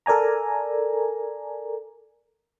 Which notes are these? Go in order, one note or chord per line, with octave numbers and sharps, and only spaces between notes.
A4 A#4 D5 G#5 A#5